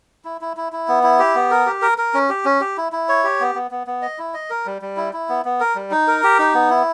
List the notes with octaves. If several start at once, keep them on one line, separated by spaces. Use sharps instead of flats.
E4
E4
E4
E4
B3
E4
G4
B3
A#4
G4
A#4
A#4
C#4
G4
C#4
G4
E4
E4
C#5
G4
B3
B3
B3
B3
D#5
E4
D#5
A#4
G3
G3
E4
E4
B3
B3
A#4
G3
D#4
A#4
G4
D#4
B3
E4